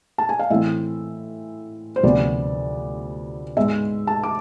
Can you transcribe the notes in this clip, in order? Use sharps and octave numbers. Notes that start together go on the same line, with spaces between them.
A5
G#5
F5
A2 E3 A3 C4 E5
C5
D2 C3 F3 B3 D5
G#2 G#3 B3 E5
A5
D6